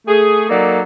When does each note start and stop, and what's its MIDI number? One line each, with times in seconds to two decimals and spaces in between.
0.07 0.48 57
0.07 0.48 68
0.49 0.81 54
0.49 0.81 58
0.49 0.81 63
0.49 0.81 69
0.49 0.81 74